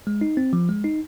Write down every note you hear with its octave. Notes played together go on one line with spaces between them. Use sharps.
G#3
D#4
C4
F3
G#3
D#4